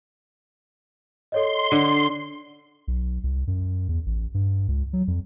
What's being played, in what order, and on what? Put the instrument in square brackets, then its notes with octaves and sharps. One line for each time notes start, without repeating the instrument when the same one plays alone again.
[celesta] A4 C#5 D#5 [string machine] C6
[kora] D3
[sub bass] B1
C2
F#2
E2
A1
G2
C#2
F#3
F2